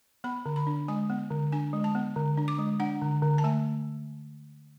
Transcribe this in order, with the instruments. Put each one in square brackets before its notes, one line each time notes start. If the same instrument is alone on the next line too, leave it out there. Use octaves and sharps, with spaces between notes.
[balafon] B3 B5
D3
B5
D4
G#3 G#5
B3
D3
D4 G#5
G#3
A5
B3
D3
D4
D6
G#3
D4 F#5
D3
D3
A5
A3 G#5